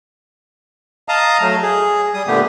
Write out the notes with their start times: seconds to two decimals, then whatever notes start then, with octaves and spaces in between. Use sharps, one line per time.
1.09 D#5 F5 A5 A#5 D#6
1.42 F#3 A3
1.62 G#4
2.14 G3 D#6
2.27 A#2 D3 A3 B3 G4